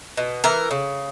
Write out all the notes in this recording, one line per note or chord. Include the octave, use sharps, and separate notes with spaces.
B2
E3 A#4
C#3